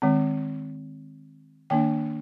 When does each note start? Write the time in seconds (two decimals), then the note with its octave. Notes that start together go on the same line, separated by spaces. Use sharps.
0.02 D#3 G#3 C4
1.70 D#3 A#3 D4 G5